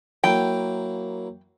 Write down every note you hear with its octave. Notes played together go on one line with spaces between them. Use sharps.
F#3 A#3 E4 G5